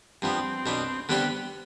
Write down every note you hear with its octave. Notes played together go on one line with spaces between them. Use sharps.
G2 F3 B3 C4
B1 B2 B3 D4
D3 G3 B3 C4 G4 C5